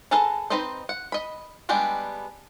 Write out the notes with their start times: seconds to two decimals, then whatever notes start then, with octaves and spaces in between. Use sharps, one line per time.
0.11 G#4 A4 B4 A5 A#5
0.50 C4 D#4 B4 C5 D#5
0.89 F#5
1.12 D#5 B5
1.69 G3 G#3 B3 D4 G4